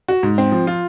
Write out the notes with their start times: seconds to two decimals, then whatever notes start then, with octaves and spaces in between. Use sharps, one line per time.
0.08 F#4
0.23 G#2
0.38 C4
0.52 F3
0.67 F4